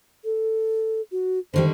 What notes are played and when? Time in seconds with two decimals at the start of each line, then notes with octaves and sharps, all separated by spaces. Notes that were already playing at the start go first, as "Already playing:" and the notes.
0.24 A4
1.12 F#4
1.54 D3 D#3 G3 C5